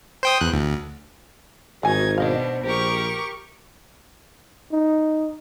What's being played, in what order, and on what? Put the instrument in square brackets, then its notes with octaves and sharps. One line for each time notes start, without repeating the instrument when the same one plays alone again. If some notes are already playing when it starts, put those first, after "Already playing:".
[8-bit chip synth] C5 G5 D#6
E2 F#6
D2
[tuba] G#1 [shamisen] E3 G#5 [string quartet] D#4 G#6 [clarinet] F#4
[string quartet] B2 D4 [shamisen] D#4 D#5 F5 [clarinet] C5
[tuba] A#1 [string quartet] G4 A#4 C#6 [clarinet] C5
[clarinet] D6
[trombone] D#4